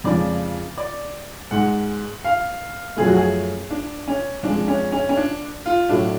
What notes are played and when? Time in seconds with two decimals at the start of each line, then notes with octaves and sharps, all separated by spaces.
0.04 F2 C#3 F3 G#3 D5
0.78 D5
1.51 G#2 G#3 F#5
2.24 F5
2.97 F#2 F3 A3 G#4
3.07 F#4
3.16 G#4
3.71 D4
4.08 C#4
4.43 F2 F3 G#3 D4
4.68 C#4
4.92 C#4
5.09 C#4
5.17 D4
5.66 F4
5.89 A2 F#3 A3 D4